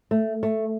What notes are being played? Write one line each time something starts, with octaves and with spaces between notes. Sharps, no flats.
A3
A3